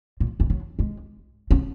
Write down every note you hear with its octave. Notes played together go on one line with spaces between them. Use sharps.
A#2
E3
F#3
G#3
C#4